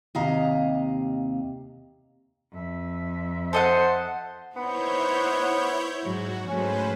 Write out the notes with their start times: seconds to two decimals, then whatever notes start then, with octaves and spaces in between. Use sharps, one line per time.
0.15 D#2 C3 D#5 F5 A#5
2.52 F2 E5
3.53 A4 C5 D#5 F#5
4.57 B3 D#4 E4 C5 C#5 G6
6.04 G#2 F#3 F#4
6.47 G#2 F#3 A3 C#4 B4 C5